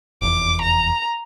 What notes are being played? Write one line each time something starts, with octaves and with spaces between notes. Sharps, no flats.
F1 E2 D6
A#5